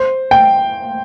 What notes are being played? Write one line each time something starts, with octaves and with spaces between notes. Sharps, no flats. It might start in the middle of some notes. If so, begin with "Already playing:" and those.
Already playing: C5
G5